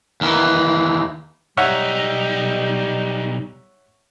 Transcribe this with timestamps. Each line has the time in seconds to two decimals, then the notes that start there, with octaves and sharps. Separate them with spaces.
0.21 D#2 E3
1.57 B1 G3 D#4 C#5 E5 F#5